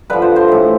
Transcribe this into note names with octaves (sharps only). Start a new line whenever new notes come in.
G2 D3 F3 B4
C5
C5
A2 E3